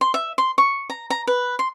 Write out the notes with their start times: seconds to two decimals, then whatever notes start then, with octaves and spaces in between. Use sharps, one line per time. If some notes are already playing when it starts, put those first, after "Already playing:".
0.01 C6
0.14 E5
0.38 C6
0.58 C#6
0.90 A#5
1.10 A#5
1.27 B4
1.59 C6